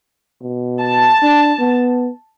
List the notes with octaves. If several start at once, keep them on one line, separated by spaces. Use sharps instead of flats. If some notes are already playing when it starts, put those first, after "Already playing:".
B2
A5
D4
B3